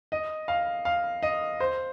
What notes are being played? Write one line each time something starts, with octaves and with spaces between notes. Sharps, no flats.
D#5
F5
F5
D#5
C5